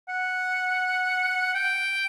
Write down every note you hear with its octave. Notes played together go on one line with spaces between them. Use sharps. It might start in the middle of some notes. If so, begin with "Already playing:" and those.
F#5
G5